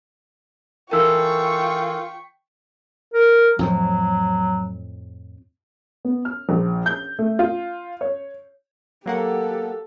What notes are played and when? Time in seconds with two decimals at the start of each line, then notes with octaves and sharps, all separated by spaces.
0.91 E3 F4 A4 A#4 G5 C#6 E6
3.14 A#4
3.59 F2 A2 F3 F#3
6.05 B3
6.25 F6
6.49 A#1
6.86 G6
7.19 A3
7.39 F4
8.01 C#5
9.06 F#3 A#3 G4 A4 F#5